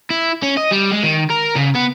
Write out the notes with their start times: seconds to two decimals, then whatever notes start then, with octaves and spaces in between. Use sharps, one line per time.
0.10 E4
0.43 C#4
0.57 D#5
0.71 G3
0.92 G#3
1.03 D#3
1.30 A#4
1.56 C#3
1.75 B3